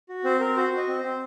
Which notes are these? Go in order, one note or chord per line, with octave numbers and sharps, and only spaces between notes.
F#4
C4 C5
C4 A#4
F#4 C5
F#4 D#5
C4
C5
C4